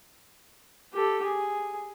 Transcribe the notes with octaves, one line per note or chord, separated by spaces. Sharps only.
G4 A4
G#4